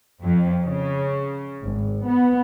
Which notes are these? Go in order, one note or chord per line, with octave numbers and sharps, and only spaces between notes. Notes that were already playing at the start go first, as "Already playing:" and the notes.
F2
C#3
G#1
B3